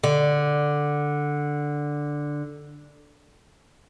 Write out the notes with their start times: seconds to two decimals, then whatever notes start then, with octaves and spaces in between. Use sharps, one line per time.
0.04 D3